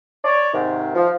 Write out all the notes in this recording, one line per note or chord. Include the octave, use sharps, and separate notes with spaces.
C#5 D5
G#2 C3 D#3
F3